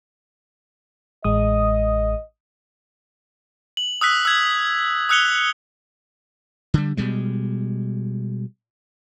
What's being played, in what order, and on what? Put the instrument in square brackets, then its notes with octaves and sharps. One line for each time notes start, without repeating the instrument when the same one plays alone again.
[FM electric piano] A1 G#3 D#6 [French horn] D#5
[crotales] F#7
D#6 E6 F#6 B6
E6 G#6
D#6 E6 F#6 C#7 F7 G7
[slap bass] D3 G3
B2 G3 G#3